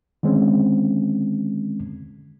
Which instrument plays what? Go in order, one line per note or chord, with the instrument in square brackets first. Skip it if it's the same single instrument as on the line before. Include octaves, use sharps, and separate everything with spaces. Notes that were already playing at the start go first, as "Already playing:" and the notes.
[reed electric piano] D3 D#3 G#3 C4 C#4